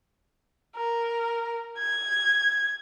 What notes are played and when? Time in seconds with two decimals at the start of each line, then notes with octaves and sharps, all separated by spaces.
0.77 A#4
1.79 G#6